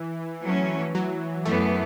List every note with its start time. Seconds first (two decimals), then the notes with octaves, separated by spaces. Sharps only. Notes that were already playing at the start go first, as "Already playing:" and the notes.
Already playing: E3
0.44 F#3 A3 C#4
0.95 F#3
1.45 F#2 E3 A3 B3